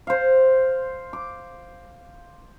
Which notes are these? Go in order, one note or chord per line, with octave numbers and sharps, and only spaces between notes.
C5 F5
D6